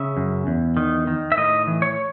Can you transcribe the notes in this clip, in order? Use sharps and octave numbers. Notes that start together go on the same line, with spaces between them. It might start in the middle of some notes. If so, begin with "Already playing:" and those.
Already playing: C#3 E5
F#2
E2
D#3
D#3
E5
A2 D#5
E3
C#5